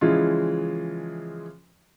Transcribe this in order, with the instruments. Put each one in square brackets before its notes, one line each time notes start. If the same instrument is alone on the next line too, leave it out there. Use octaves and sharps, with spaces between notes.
[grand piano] C#3 E3 F3 G#3 F4